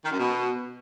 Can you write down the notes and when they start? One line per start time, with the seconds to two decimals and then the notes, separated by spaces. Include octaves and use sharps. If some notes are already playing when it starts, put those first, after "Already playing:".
0.03 D#3
0.11 F#2
0.18 B2